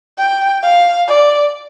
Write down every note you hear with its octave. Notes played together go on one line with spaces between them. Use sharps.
G5
F5
D5